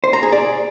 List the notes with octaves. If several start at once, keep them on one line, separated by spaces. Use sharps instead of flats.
C5
A#5
G#4
D5